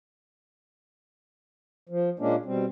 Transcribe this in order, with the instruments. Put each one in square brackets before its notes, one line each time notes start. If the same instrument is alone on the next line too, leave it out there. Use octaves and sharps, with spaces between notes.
[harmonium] F3
A#2 G#3 A#3 C#4 D4
B2 G3 C4